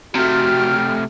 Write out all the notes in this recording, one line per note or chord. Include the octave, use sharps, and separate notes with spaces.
C3 A3 F#4 G5 F6